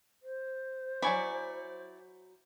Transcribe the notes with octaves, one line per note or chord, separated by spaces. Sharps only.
C5
F#3 E4 D5 G#5 B5 C#6